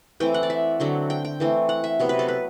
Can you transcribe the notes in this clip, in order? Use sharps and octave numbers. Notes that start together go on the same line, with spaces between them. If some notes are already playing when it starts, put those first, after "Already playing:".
E3 A3 C4 G5
F#5
D5
E5
D3 F#3 C4
G5
G5
E3 A3 C4
F#5
E5
C3 F#3 B3
B4
A4
B4